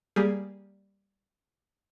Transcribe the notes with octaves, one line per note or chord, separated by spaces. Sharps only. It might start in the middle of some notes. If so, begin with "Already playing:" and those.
G3 A#3 G4 G#4